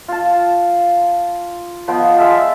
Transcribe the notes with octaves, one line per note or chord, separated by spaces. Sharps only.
F4 A5
F3 B3 D#5 G5
G#3 E5 F5 A5